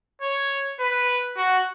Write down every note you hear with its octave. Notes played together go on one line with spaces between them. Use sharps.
C#5
B4
F#4